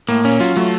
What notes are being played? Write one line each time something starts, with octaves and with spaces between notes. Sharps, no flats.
A2 A#3
A#2 C#4
F#3 F4
F#3 A3